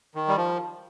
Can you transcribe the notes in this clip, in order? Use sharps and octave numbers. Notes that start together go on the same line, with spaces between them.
D#3
G3
F3